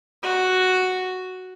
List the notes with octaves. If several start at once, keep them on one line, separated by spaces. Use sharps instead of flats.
F#4